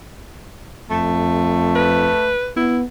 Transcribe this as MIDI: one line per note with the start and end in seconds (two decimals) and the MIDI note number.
0.90 2.12 41
0.90 2.30 57
1.76 2.50 71
2.56 2.83 59
2.56 2.79 64